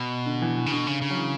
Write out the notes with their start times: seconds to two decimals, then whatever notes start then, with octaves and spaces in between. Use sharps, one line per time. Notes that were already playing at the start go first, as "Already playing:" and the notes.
Already playing: B2
0.26 D3
0.42 E3
0.56 E3
0.66 C#3
0.72 B2 D3
0.87 C#3
1.02 C#3
1.10 F#3
1.16 E3